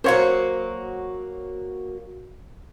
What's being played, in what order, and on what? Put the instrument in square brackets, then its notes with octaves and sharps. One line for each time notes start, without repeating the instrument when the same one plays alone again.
[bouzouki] F#3 A#3 F#4 [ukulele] C5 C#5 F5